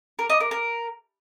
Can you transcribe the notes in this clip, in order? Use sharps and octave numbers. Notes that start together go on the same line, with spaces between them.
A#4
D#5
A#4
A#4